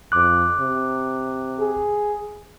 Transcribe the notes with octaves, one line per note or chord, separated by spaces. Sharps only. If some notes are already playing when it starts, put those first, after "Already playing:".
F2 D6 F#6
C3
G#4